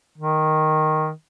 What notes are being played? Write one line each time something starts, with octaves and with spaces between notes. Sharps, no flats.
D#3